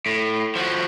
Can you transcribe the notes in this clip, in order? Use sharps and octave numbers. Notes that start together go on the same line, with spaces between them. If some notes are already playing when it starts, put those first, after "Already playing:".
A2
F3 F#4